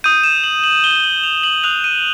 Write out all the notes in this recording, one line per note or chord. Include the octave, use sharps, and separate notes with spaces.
D#6 G6 D#7
E7
F#7
F#7
G7
F#7
F7
F#7
D#6 F#6 F7
D#7